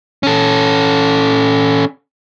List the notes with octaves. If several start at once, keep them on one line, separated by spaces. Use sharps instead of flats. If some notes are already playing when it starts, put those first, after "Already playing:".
C#4 A4